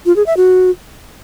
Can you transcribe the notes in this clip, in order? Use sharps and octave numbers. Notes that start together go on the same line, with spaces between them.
F4
G#4
E5
F#4